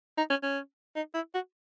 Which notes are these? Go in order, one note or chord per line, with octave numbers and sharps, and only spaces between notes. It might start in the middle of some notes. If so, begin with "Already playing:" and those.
D#4
C#4
C#4
D#4
E4
F#4